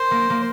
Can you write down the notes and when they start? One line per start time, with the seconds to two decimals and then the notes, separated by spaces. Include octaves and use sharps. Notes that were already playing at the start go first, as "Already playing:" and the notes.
Already playing: A#4 C5
0.11 A#3
0.30 A#3